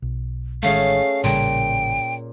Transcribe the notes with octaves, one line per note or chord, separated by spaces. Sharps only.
B1
A1 D#3 G#3 A3 C#4 G#4 F5
A1 A#2 C#3 G3 G5